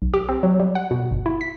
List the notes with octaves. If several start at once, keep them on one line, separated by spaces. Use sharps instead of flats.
B1
G4
C4
F#3
G3
F#5
B2
G1
E4
B6